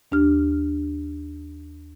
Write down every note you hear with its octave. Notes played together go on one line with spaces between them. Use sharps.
D#2 D4 G4 F6